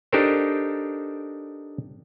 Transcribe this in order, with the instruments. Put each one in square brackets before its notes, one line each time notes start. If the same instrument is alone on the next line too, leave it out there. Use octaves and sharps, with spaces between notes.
[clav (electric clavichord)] D4 D#4 G4 A4 A#4 C5